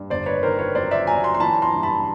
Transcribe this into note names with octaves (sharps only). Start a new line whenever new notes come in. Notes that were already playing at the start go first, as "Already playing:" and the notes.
Already playing: G2
G1 C5 D5
B4 C#5
D#3 A#4 C5
B4 C#5
F#2 C5 D5
D5 E5
F#2 G#5 A#5
A#5 C6
C6
E3 A5 B5
A#5 C6
G2
A5 B5